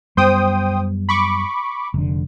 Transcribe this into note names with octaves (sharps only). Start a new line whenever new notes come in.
F#2 G3 B3 C5 G5 D#6
B5 C#6 D6
F1 D3